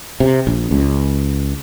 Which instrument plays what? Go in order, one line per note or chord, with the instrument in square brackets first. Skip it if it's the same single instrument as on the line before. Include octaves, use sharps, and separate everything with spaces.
[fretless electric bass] C3
A#1
C#2